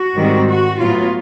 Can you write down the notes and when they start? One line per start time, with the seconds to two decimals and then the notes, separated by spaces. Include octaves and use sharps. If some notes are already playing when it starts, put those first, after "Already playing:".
Already playing: F#4
0.16 G#2 D#3 G3 C4
0.49 F#4
0.79 A2 F#3 B3 F4